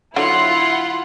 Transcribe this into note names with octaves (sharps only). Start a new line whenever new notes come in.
D3 F#3 E4 F4 F#5 C6